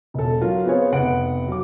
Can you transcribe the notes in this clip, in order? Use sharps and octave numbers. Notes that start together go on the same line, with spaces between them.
E1 A4
F#3 F4 A#4
B3 C4 F4 G#4 C#5
F1 B3 F#5 D7
F#3 D6